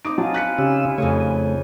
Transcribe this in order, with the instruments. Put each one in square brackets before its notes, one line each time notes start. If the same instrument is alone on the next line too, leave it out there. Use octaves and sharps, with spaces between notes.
[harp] C4 D#4 [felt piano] D6 D#6 D7
[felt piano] F#3 [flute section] E4 F4 G#5 [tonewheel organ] A5
[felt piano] F#6 B6 C#7
[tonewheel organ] C#3 C#4 E6 [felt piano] G4
[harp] F2 G#4 C#5 [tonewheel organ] C#3 A3